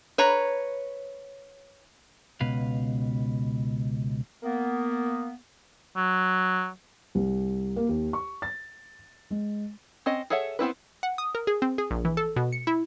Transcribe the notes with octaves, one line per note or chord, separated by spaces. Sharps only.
B4 C#5 A#5
C#2 B2 B4 F5
A#3 B3
F#3
C2
A#3
D#2
C#6
A6
G#3
C4 C#4 D#5
G#4 A4 C#5 E5 F#5
B3 C4 E4 B4
F#5
D#6
A#4
G#4
C4
G#4
A#1
E3
A4
B2
C#7
E4